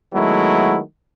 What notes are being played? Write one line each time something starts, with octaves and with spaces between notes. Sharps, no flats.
D#3 F#3 G#3 A3 B3 E4